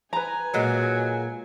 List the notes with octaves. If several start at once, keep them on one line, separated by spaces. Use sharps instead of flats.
B4 G#5 A#5
A#2 F#3 G#3